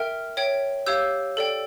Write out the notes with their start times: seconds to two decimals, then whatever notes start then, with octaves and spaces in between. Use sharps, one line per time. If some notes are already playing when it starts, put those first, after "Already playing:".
Already playing: A#4 E5 G5 F6
0.37 C#5 E5 G5
0.86 G4 C#5 F5 E6 G6
1.37 A4 D5 G5